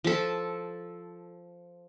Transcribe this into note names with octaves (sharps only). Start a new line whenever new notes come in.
F3 A4